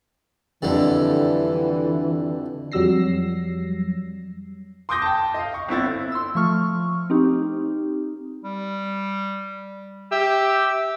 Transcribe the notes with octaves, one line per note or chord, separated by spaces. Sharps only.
F2 D3 E3 G3
F2 F#3 G3 E6 A#6 C7
C6 D6 D#6 G6 A#6
G5 A5
D#5 F5
C#6
G1 C4 E4 A6
C6 E6
F3 A3 C#6 F6
C4 D#4 G4
G3
G4 E5